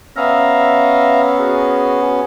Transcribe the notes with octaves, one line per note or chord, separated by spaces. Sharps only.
B3 C#4 E5 F5 A#5
F#4 G#4